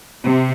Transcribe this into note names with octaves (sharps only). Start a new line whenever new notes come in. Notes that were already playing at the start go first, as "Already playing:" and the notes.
C3